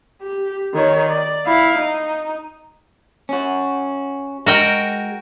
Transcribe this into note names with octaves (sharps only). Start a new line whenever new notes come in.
G4
D#3 C#5
D5
E4 F5
D#4
C#4 F#4
G#3 F#4 A#4 G5